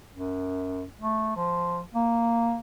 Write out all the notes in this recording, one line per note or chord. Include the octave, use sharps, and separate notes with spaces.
F#2
A3
F3
A#3